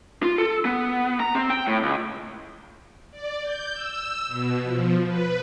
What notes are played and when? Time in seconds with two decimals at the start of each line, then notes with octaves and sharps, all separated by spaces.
0.23 F4
0.38 A4
0.65 B3
1.20 A#5
1.35 C4
1.50 G5
1.67 A2
1.83 C#2
3.11 D5
3.42 G6
3.72 E6
4.27 B2
4.63 F3
5.06 B4